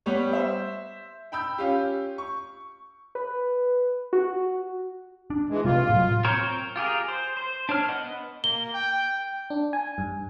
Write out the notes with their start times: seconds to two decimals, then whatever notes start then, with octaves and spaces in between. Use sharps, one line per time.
0.06 G3 B3 G4 C#5
0.33 C5 E5
1.32 G5 B5 E6 G6
1.58 C#4 F4 G4
2.18 C#6
3.15 B4
4.13 F#4
5.30 D4
5.50 E3 G#3
5.65 C3 G3 A3 F4
5.90 A2 F#3
6.25 C4 A#4 C5 C#5
6.76 F4 G4 G#4 A#4
7.08 C5
7.37 C5
7.69 D4 C5 C#5 F6
7.88 B3 D#5 F#5
8.44 A#3 G7
8.74 G5
9.50 D4
9.73 G#5
9.98 G2